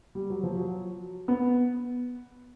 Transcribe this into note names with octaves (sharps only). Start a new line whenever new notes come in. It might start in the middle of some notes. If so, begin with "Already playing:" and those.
G3
F#3
F3
F#3
B3